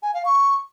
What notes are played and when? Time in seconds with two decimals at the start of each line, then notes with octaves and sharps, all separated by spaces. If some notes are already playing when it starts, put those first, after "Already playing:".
0.03 G#5
0.14 F5
0.25 C#6